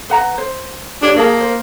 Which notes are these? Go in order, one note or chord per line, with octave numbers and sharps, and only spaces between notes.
B4 F#5 A#5
C5
D4 G4 C#5
A#3 F#4 G#4 A5
C5